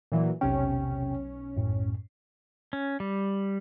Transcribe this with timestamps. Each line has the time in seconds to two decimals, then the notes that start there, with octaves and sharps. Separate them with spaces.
0.12 A#2 E3 F#3
0.41 B1 E2 C3 C#4 G5
1.56 F#2 A2
2.73 C#4
3.00 G3